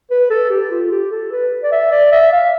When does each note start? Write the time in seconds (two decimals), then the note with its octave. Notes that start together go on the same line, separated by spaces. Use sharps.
0.11 B4
0.30 A4
0.50 G4
0.71 F4
0.91 G4
1.11 A4
1.32 B4
1.63 D5
1.72 E5
1.91 D5
2.12 E5
2.32 F5